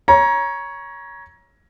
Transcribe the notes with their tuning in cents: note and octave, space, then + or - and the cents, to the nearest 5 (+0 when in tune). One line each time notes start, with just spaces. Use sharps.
C#5 +0 A#5 +25